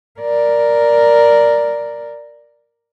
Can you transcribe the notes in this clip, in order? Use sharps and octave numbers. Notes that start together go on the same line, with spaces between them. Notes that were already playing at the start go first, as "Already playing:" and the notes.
A#4 D5